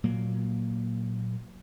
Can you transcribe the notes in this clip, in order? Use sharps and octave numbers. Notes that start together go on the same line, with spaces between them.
A#2 F#3 A#3